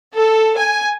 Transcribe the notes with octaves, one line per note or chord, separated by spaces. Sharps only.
A4
G#5